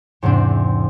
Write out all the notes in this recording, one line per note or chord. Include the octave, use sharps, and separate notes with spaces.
E2 G#2 C3 C4 D4